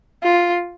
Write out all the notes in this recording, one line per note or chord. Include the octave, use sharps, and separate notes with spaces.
F4